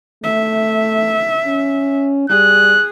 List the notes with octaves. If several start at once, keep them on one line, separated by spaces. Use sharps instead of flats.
A3 E5
C#4
G3 G#4 F#6